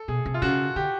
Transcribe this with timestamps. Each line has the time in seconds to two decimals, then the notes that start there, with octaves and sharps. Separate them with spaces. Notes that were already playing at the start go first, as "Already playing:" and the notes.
Already playing: A4
0.08 B2 G#4
0.25 C3
0.34 F4
0.42 C#3 F#4
0.76 D3 G4